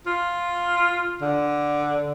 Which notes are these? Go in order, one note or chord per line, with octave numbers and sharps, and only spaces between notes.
F4
D3